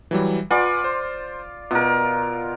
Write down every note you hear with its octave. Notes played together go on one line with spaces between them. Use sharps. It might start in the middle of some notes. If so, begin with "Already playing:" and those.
E3 F#3 G3
F4 B4 D5 F#5 G#5
C5
B2 F4 A#4